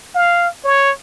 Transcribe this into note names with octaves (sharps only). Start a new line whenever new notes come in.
F5
C#5